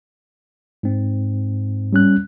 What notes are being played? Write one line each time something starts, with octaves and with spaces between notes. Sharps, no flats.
G#2 C4
G3 C#4 F#6